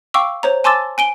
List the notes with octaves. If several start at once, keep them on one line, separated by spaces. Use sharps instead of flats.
F5 G5 C#6 D6 E6
C5 C#5 A#5
G#5 A5 C6 D6 E6 A6
G#5 D7 G7